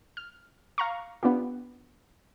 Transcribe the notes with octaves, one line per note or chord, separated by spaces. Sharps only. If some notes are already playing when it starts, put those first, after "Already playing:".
F6
F5 A#5 C#6
B3 D4 F4 G4